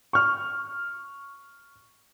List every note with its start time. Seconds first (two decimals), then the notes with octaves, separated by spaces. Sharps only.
0.13 C#6 F6